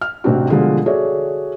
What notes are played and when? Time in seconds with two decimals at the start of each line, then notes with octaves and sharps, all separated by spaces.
0.01 F6
0.24 A1 C3 C4 D4 F#4
0.50 B2 D3 F3 G3 G#3 F4
0.86 F#4 G#4 A4 C#5 D5 E5